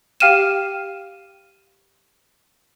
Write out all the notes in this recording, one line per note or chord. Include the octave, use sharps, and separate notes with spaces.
G4 F5 G5 F6 D#7 E7